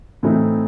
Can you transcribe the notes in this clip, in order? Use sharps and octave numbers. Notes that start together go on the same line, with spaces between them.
A2 E3 A3 C4 D#4